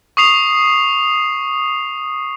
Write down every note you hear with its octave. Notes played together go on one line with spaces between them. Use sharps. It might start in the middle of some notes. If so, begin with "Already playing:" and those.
C#6 D#6 C7 F7